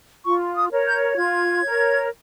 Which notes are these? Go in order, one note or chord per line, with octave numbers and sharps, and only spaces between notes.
F4 C#6
D#6
A#4 C#5
G6
F4 G#6
A#4 C#5